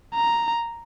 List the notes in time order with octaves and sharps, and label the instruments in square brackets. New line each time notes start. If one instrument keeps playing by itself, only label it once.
[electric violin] A#5